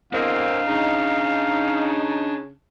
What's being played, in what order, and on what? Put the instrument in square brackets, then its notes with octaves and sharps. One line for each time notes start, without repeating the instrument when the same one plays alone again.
[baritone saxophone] E2 [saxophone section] D3 A#3 C4 [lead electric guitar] D4 D#5 [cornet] F5
[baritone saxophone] C#3 [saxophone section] D#4